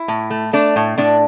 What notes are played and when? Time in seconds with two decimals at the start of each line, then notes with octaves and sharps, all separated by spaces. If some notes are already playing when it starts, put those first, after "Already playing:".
Already playing: E4
0.08 A2
0.30 A3
0.53 A3 D4
0.76 A2
0.98 A2 D4